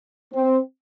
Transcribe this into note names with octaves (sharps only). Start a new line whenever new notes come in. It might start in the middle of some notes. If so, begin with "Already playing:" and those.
C4